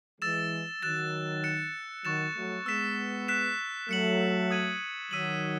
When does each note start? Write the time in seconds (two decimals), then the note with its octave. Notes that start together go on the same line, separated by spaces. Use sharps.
0.21 E3 G#3 E6 A6 E7
0.82 D#3 F#3 F#6 A6 E7
1.44 F#6 C#7 E7
2.05 D#3 F#3 C#6 F#6 A6 E7
2.35 F#3 A3
2.66 G#3 B3 E6 B6 E7
3.28 F#6 B6 E7
3.89 F#3 A3 F#6 C#7 F#7
4.51 D#6 G#6 D#7 F#7
5.11 D#3 F#3 E6 B6 D#7 F#7